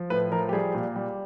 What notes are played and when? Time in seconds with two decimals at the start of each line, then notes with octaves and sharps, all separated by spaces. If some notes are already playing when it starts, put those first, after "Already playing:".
Already playing: F3
0.10 A2 B4
0.32 F3 A#4
0.49 G4
0.53 G3 G#4
0.75 A#2
0.96 G3